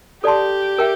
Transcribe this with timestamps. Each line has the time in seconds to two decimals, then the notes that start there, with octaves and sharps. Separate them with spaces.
0.24 G4 A4 D5 A5 C6
0.79 A#4 E5 G5